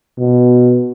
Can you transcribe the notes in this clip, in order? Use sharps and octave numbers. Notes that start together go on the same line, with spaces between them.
B2